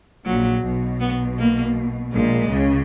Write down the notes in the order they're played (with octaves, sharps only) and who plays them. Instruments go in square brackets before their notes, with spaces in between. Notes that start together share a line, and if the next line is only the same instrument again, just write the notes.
[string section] A#1 A#2 [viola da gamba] F#3
[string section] B1 B2
[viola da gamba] B3
A#3
[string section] A#1 A#2 [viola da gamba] G#3
[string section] C#2 C#3